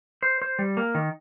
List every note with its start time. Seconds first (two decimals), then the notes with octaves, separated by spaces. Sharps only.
0.23 C5
0.42 C5
0.59 G3
0.77 A#3
0.95 D#3